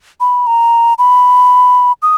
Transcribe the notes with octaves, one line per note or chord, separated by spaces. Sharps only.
B5
A#5
B5
D#6